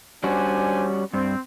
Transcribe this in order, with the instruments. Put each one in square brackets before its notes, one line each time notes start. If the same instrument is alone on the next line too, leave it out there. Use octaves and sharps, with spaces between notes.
[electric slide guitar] G3 C#4 F#4 [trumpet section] D4 C5 G#5
[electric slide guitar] G2 [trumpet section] C4